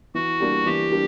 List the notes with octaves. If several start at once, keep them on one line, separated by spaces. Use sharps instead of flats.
E3 F#4
G3 A#3 D4
E3 G4
G3 A#3 D4